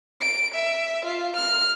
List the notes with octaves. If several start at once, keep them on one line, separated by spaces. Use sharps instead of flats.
D7
E5
F4
F6